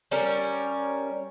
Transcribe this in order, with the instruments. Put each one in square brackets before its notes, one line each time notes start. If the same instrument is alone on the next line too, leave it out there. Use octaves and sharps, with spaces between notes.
[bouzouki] G3 C#4 A#4